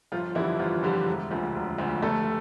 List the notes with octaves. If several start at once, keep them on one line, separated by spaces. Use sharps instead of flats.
G1 F3 F4
F2 D3 E3 G3 E4
G1 F3 F4
F2 D3 G3
E1
D2 D3 F3
E1
D2 D3 F3
F1 A3 A4